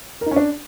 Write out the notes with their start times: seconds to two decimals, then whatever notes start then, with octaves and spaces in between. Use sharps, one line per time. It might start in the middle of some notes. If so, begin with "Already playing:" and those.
0.21 A#4
0.26 D#4
0.31 C#4
0.36 D4